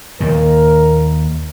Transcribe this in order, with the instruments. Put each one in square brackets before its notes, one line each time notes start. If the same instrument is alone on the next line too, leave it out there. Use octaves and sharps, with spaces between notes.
[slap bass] D#2 A#2 D#3 [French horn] A#4